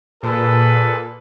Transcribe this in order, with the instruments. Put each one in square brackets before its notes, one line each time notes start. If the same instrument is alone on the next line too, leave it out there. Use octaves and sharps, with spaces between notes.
[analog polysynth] A#2 [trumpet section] G#4 A4 B4